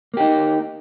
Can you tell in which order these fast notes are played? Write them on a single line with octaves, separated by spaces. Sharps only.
A#3 G4 D#4